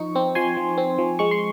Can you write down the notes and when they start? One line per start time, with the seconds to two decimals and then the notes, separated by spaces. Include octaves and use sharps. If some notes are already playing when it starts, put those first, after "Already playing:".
Already playing: F3 D#4 C#6
0.15 C4
0.35 F3 G#5 C6
0.57 F3
0.78 C4
0.98 F3
1.19 G#3 C#6
1.31 C6